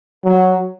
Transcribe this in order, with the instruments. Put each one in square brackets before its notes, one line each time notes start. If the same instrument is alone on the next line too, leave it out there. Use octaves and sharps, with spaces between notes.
[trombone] F#3